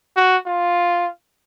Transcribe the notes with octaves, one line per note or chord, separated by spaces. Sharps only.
F#4
F4